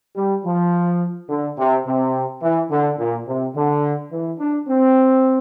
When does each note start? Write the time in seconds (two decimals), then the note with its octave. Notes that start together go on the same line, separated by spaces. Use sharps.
0.16 G3
0.45 F3
1.29 D3
1.57 C3
1.86 C3
2.42 E3
2.70 D3
2.98 A#2
3.26 C3
3.55 D3
4.11 E3
4.39 D4
4.68 C4